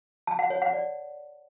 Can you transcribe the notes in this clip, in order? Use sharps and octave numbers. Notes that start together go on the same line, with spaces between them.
A5
F#5
C#5
F#5
D5